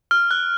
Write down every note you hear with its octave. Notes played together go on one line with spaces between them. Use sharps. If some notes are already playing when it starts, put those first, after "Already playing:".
F6
F#6